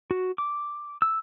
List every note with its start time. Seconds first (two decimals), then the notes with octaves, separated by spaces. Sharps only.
0.11 F#4
0.38 D6
1.02 E6